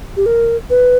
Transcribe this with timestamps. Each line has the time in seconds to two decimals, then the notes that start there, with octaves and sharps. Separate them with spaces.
0.17 G4
0.26 A#4
0.70 B4